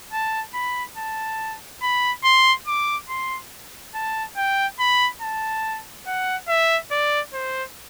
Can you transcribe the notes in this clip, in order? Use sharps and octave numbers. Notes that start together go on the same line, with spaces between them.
A5
B5
A5
B5
C6
D6
C6
A5
G5
B5
A5
F#5
E5
D5
C5